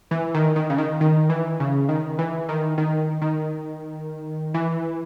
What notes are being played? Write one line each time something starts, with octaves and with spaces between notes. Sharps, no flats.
E3
D#3
D#3
C#3
D#3
D#3
E3
C#3
D#3
E3
D#3
D#3
D#3
E3